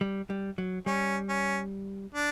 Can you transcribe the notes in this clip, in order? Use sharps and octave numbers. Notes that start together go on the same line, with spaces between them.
G3
G3
F#3
G3 C#4
C#4
D4